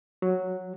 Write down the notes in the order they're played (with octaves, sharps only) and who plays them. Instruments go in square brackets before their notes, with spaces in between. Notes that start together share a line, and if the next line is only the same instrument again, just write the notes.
[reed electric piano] F#3